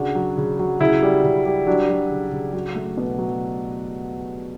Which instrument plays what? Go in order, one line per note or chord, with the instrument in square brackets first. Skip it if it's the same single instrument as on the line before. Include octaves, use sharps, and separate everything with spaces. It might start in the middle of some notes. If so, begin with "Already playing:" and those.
Already playing: [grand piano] C#3 D4 F#4
F#3
C#3
F#3
C#3 E4
G3
C#3
G3
F#3 D4
F#3
C#3
C#3
F#3
A3
B2
F#3